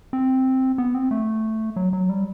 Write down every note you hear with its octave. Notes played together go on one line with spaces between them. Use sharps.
C4
B3
C4
A3
F#3
F#3
G3